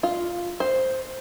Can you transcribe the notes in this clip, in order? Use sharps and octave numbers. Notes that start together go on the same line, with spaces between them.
F4
C5